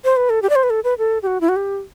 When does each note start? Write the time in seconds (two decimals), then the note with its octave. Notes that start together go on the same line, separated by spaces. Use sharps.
0.04 C5
0.17 B4
0.30 A4
0.42 G4
0.50 D5
0.56 C5
0.63 B4
0.70 A4
0.84 B4
0.98 A4
1.23 G4
1.27 F#4
1.41 E4
1.49 F#4
1.56 G4